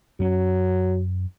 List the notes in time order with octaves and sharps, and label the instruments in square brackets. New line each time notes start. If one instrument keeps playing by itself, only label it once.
[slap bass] F#2 C#4 [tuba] F#3